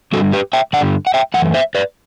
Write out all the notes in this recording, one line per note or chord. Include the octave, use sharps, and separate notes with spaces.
G2 D3 G3 F#4 A4
G4 B4
E5 G5
G2 D3 G3 D5 F#5
F#5
E5 G5
F#2 E3 A3 F#5
C5 E5
B4 D5